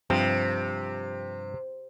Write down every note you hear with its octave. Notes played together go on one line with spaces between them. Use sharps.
G2 C3 F3 C4